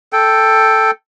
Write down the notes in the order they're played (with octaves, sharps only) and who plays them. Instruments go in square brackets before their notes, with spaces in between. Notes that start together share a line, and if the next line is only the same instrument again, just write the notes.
[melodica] A4 G5